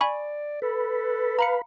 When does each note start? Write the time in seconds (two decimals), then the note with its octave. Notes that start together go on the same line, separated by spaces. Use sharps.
0.01 D5 G#5 B5 C#6
0.62 A4 B4
1.39 F5 A#5 B5 C#7